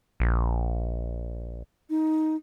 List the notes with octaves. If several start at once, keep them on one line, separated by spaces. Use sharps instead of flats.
A#1
D#4